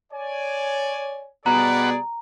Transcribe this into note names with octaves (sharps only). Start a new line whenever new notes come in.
C#5 D5 G#5
B2 G3 G#4 D5 F#5 A#5 B5